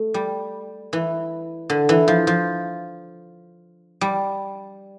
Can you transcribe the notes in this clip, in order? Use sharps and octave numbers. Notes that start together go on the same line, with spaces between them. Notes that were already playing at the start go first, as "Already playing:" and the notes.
Already playing: A3
G3
E3
D3
E3
F3
F3
G3